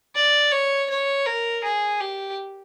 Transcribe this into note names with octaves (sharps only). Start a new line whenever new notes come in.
D5
C#5
C#5
A#4
G#4
G4